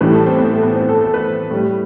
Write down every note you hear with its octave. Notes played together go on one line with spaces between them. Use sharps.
A2 E3 G3 B4
A4
C4
B3
A3
B3
C4
A4
A4
B4
A2 G3